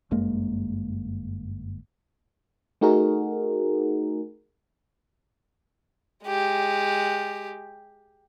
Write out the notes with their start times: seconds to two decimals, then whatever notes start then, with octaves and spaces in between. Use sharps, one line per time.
0.11 G1 F#2 G#3 A#3
2.81 A3 D#4 F#4 G#4 A#4
6.25 G#3 G4